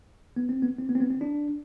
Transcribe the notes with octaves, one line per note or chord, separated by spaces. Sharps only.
B3
C4
B3
C4
B3
C4
B3
C4
D4